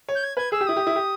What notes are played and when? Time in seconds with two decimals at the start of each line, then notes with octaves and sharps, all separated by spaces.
0.08 C#5
0.15 G6
0.23 G#6
0.37 B4 G#6
0.52 G#4 E6
0.61 G4
0.66 E4 D#6
0.76 G4
0.87 E4
0.96 G4